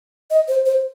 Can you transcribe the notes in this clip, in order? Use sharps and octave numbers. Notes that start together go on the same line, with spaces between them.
D#5
C5
C5